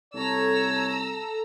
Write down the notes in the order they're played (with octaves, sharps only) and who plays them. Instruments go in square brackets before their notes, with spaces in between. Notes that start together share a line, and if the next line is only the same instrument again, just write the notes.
[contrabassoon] C2 [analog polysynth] A4 [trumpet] C#5 [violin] A#5 E6